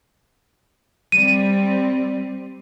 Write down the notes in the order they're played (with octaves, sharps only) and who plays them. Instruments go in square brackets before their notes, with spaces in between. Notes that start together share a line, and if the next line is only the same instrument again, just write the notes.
[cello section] G3 C4 [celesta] D#7